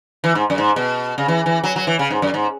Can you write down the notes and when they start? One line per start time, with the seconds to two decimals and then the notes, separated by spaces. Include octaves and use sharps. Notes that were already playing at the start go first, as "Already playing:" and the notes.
0.24 E3
0.35 G#2
0.50 F#2
0.58 G#2
0.76 B2
1.18 C#3
1.28 E3
1.46 E3
1.64 F#3
1.76 F#3
1.87 E3
1.99 C#3
2.10 G#2
2.22 F#2
2.34 G#2